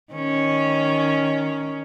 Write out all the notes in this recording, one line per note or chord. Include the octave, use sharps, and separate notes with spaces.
D#3 C#4